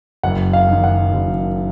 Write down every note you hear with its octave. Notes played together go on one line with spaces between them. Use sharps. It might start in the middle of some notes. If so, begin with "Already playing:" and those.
F#1 F#5
F5
F#2 D#3
F#5
F#1